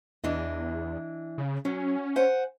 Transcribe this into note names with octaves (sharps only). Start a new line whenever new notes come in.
E2 E3 D4 D#5
C#3
F#3 C#4
C5 F#5 G#5